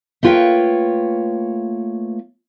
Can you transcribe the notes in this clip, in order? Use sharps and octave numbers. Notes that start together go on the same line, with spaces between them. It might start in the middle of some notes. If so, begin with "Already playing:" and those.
A3 A#3 F4 B4 C#5 G5